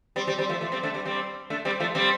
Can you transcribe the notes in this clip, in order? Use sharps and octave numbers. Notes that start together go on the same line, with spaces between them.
G3 C4
G3 C4
G3 C4
F3 A3
F3 A3
G3 C4
A3 D4
G3 C4
G3 C4
A3 D4
G3 C4
F3 A3
G3 C4